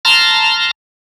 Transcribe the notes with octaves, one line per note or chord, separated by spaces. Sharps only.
A5 A#5 C6 F6